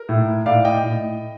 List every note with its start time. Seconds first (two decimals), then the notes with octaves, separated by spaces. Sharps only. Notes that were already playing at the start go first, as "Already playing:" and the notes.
Already playing: A#4
0.09 A2
0.46 A2 D5 F5
0.65 D#5 G5
0.83 A2